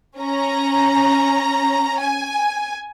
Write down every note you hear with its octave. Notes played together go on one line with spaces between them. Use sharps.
C#4 A#5
G#5